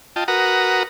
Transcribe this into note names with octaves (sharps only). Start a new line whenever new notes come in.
F4 D#5 G5 A5
F#4 A#4 B4 F#5 A#5 D#6